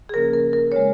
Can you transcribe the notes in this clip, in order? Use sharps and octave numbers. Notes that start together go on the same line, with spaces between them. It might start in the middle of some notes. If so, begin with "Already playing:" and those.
G#4
C#3 F3 A#3 C#4 A#4
A#4
A#4
C#3 G#3 C#5